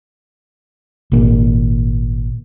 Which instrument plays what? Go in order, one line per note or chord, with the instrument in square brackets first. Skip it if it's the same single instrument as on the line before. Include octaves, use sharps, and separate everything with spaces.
[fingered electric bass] G#1 A#2